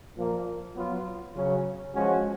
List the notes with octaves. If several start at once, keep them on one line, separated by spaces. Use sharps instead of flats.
A#2 F3 A#3
F#3 B3 F4
C#3 F#3 C#4
F3 G#3 C#4 F#4